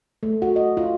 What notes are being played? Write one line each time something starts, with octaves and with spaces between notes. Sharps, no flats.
A3
F#4
D#5
F4